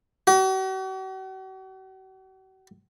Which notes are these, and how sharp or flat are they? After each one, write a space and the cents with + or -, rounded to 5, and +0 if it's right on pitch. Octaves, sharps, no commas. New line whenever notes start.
F#4 +45